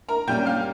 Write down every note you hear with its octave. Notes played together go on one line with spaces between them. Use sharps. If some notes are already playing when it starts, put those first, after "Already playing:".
A#4 A#5
A#2 G3 C#4 G5 G6
F5 F6